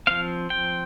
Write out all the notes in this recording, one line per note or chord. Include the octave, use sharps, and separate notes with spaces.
F3 C4 F5
G5